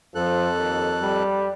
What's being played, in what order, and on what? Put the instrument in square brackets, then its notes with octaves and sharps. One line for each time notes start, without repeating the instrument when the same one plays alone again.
[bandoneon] F2 A4 F#6 [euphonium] F3
[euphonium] D#2
G3